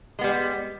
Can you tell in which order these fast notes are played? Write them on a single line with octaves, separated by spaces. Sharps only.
G#3 B3 G3